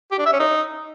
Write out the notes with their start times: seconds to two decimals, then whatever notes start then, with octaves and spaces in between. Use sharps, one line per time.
0.12 G4
0.19 D4
0.26 E5
0.33 C#4
0.40 D#4